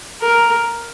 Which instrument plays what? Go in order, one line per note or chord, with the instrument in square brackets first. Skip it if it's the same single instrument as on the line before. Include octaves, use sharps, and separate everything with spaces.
[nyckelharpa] A#4